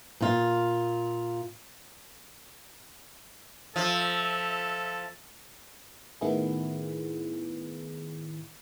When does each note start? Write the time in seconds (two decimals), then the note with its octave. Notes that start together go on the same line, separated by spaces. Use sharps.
0.21 A#2 F4
3.76 F3 A4 E5
6.21 A2 D#3 B3 E4 G#4